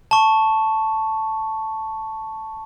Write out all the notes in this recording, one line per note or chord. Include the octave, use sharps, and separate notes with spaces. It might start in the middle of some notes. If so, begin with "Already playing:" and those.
A5 C#6